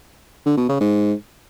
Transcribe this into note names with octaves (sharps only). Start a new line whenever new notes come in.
D3
B2
C#3
G#2